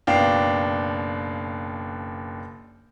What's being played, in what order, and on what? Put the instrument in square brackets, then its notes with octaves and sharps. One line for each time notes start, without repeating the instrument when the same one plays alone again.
[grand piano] F#1 B2 D4 F5 G5